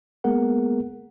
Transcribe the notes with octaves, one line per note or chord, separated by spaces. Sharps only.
G#3 A#3 B3 G#4 A#4 F#5